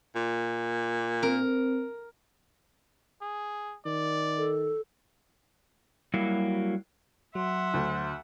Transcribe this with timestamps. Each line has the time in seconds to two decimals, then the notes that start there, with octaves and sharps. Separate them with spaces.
0.16 A#2
1.23 C4 A#4
3.22 G#4
3.86 D#3 D5
4.38 A4
6.14 F#3 G3 A#3 E4 F#4
7.35 F#3 E5 F#5 C6
7.74 D2